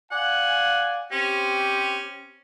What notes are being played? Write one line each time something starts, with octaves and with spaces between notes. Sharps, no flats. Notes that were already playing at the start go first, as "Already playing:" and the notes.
D5 F5 F#5 G#5
C4 C#4 G4